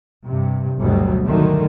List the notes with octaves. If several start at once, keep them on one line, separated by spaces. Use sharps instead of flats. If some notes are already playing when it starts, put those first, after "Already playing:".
G2 C3
G1 D2 B2 F#3 G3
D3 D#3 F#3 A3